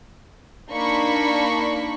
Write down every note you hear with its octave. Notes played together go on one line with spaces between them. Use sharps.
A#3 D4 D#4 B5 C#6